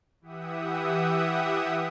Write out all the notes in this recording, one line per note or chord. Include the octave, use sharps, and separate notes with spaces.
E3 G4 E5 F#5 D#6